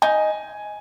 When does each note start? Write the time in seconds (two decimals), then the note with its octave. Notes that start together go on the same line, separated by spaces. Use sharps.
0.02 D#4 G#5